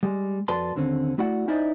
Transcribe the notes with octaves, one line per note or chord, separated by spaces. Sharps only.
G3 G#3
F2 F#4 B4 D5 A5 C6
D#2 D3 C4 C#4
A3 E4 F#4 D5 F#5
C#4 D#4 E4 C5 D5 D#5